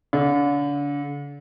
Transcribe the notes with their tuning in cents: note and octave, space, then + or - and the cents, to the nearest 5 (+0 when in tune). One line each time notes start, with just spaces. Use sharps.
D3 -35